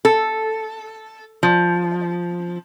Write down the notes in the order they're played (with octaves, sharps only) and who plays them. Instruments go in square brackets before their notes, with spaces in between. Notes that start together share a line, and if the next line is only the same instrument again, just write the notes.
[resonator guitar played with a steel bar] A4
F3